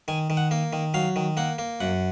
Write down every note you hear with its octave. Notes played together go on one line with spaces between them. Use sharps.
D#3 G#5
D#3
F#5
A#3
D#3
F#3 F5
D#3
A#3 F#5
A#3
F#2 F#5